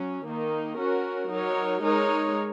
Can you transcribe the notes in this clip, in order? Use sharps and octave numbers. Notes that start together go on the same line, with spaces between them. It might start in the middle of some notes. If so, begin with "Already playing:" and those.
Already playing: F#3 C#4
D#3 A#3 D#4
C#4 F#4 A#4
F#3 D#4 A#4 C#5
G#3 D#4 A#4 C#5